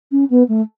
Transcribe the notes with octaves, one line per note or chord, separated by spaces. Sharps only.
C#4
B3
A3